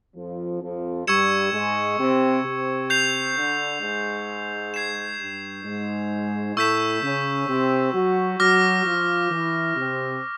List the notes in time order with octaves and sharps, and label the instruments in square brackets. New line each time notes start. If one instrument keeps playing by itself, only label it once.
[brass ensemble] F2 F3
F2 F3
[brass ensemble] G2 G3 [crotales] C#6 E6 G#6 C#7 E7
[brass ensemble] G#2 G#3
C3 C4
C3 C4
[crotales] G6 C7 F7
[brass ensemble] D3 D4
G#2 G#3
[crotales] G#6 C7 E7
[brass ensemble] G2 G3
G#2 G#3
[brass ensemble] A2 A3 [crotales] C#6 E6 G6 B6 E7
[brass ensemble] C#3 C#4
C3 C4
F#3 F#4
[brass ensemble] F#3 F#4 [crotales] D6 F6 A#6
[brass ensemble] F3 F4
E3 E4
C3 C4